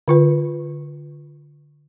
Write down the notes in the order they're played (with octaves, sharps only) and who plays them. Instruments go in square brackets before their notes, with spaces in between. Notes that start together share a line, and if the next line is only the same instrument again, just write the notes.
[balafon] D3 F4 B4